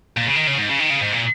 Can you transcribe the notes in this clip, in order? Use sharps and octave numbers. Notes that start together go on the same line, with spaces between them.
A#2
C#3
D#3
C#3
G#2
C#3
D#3
C#3
G#2
A#2